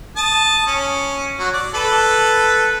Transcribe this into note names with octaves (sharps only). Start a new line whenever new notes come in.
A5 D#6
C#4
F#3
D5
A4 B4 B5